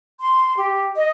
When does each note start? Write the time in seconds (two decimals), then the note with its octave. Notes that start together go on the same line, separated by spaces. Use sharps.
0.20 C6
0.56 G4
0.95 D#5